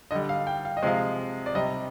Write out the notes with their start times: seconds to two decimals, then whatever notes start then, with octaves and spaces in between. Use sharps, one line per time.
0.11 D3 G3 D#5
0.29 F5
0.47 G5
0.65 F5
0.77 D#5
0.83 C3 F3 G#3 F5
1.46 D5
1.55 C3 G3 D#5